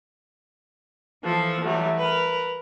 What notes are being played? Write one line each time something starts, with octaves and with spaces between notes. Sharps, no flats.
E3 F3 A4
E3 F#3 G3 A3
A#4 B4